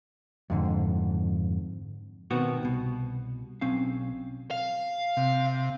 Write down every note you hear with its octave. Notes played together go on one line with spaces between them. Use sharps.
F2 G#2 D3
B2 D#3 B3 C4 F#4
C2 B2
B1 C4 C#4 F5
F5
C3